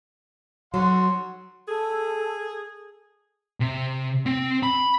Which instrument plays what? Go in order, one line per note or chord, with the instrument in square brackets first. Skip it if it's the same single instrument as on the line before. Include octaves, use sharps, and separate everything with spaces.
[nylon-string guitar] F#3 [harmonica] F#5 C6
[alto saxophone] G#4 [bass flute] A4
[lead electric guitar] C3
C4
B5